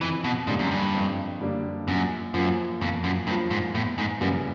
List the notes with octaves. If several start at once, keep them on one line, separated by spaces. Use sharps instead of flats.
F2 E3
B2
G#2 D3 G3 A#3 D4
F#2
G2
F2
D3 G3 A#3 D4
F#2 A#2
F#2 F3 A#3
F2 A#2
F#2
G2 F3 A#3
G#2
E2 A2
G#2
F#2 C#3 E3 G3 A#3